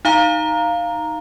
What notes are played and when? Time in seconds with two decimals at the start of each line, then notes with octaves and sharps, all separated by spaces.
0.05 D#4 F5 A#5